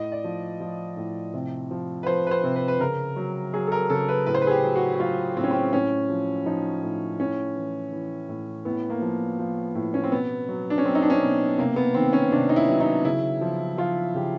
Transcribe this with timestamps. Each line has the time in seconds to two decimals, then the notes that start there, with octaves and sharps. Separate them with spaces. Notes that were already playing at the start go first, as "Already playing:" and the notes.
Already playing: A2 D#5
0.12 D5
0.24 F3
0.61 F3
0.97 A2
1.34 C3
1.71 F3
2.03 B4
2.07 F3 C5
2.27 B4
2.31 C5
2.43 C3
2.56 B4
2.68 B4
2.80 C#3 A#4
3.16 F#3
3.54 F#3 G#4
3.67 A4
3.72 A#4
3.90 C#3 A4
4.09 B4
4.26 A2 B4
4.35 C5
4.42 B4
4.47 G#4
4.51 G4
4.63 F#3
4.76 F#4
4.95 F#4
5.00 F#3 F4
5.37 A2 C4
5.44 C#4
5.51 C4
5.72 A2 C#4
6.09 F3
6.46 F3 D#4
6.83 A2
7.19 A2 C#4
7.56 E3
7.92 E3
8.29 A2
8.65 A2 B3
8.90 A#3
9.02 F3
9.39 F3
9.75 A2
9.94 C#4
10.04 C4
10.12 B2 B3
10.49 F#3
10.70 D4
10.78 C#4
10.85 F#3 C4
10.95 D#4
11.02 D4
11.10 C#4
11.22 B2
11.58 C3 A#3
11.76 B3
11.94 D#3 C4
12.13 C#4
12.32 C3 D4
12.49 D#4
12.56 E4
12.68 F#3
12.80 D#4
13.05 C#3 E4
13.41 F3
13.77 F3 F4
14.15 C#3 G4